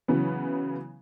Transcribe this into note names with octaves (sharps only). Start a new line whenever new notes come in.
C#3 E3 F#3 B3